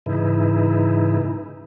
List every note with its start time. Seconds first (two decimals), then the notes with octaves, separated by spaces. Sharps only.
0.06 G#2 C#3 E3 D#4 E4